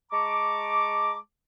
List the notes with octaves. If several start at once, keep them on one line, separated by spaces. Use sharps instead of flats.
G#3 A5 A#5 C#6 D6